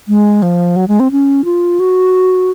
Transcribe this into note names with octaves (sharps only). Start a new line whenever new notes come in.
G#3
F3
F#3
G#3
C4
C#4
F4
F#4